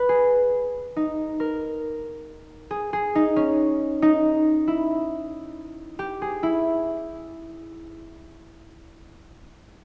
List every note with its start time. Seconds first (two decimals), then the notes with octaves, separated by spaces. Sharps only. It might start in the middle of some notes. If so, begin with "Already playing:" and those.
Already playing: B4
0.09 G#4
0.96 D#4
1.40 A#4
2.71 G#4
2.93 G#4
3.15 D#4
3.36 C#4
4.02 D#4
4.68 E4
5.99 G4
6.22 G#4
6.43 E4